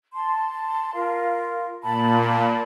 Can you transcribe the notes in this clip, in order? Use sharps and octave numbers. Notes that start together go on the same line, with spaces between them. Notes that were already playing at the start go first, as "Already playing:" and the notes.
A5 C6
F4 A#4 F5
A#2 A5 B5